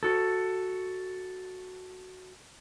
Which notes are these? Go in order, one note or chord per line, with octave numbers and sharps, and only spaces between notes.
F#4 A4